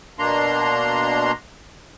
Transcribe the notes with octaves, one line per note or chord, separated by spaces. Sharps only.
B2 A#3 D4 A#5 C6